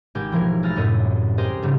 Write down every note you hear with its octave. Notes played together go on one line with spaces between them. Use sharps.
G#1 G#3 G4 G5 G#6
B1 E3 F3 A#3 A#4 G#6
G#3 A3 B3 F6 A6 A#6
C2 F#2 A2 C#5 D#5
G4 G#4 A#4 C5 D#5 G5
B1 G#2 C#3 G3